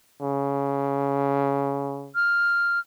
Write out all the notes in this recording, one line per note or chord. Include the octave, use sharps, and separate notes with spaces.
C#3
F6